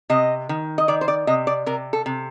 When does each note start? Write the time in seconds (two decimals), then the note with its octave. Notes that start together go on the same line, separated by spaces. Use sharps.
0.10 C3 D#5
0.49 D#3
0.78 D#5
0.88 D#3 D5
1.01 C5
1.08 D5
1.27 C3 D#5
1.47 D5
1.66 C3 A#4
1.93 A4
2.06 C3